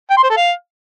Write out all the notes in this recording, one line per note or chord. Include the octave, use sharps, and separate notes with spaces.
G5
C6
C5
A4
F5